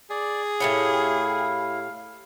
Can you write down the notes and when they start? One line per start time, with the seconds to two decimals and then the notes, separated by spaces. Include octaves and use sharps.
0.10 G#4 D5
0.60 A2 E4 G4 C#5 F5